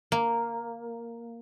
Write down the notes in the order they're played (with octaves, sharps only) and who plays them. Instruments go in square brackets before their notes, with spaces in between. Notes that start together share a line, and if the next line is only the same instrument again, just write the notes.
[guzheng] A#3